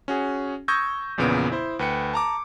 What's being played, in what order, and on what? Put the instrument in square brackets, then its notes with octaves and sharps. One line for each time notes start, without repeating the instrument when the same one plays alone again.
[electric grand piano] C#4 F#4 G#4
C#6 D#6 E6 G6 G#6 A#6
A#1 E2 A#2 C#3 B3 D7
E4 C5
D2 B4 G5 C#7
A5 A#5 D6